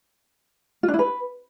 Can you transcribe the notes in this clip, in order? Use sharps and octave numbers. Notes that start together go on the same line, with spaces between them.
F4
D4
E4
B4